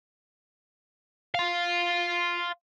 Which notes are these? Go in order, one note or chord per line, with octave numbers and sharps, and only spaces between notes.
F5 C6